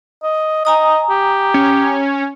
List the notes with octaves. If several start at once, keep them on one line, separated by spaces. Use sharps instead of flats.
D#5
D#5 G#5 A#5 D#6
G4
C#4